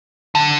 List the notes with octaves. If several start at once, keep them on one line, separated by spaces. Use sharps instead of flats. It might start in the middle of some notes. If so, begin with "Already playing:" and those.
D3